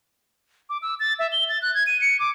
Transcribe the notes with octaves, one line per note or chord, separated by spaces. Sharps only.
D6
E6
A6
E5
G7
A6
F#6
G#6
D#7
C#7
D6